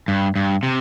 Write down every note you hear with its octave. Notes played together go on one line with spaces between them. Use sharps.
G2
G2
C3